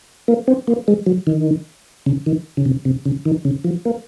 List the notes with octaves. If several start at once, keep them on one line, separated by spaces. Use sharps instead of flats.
A#3
C4
A#3
G#3
F#3
D#3
C#3
D#3
C#3
C3
C3
C#3
D#3
C#3
F3
A#3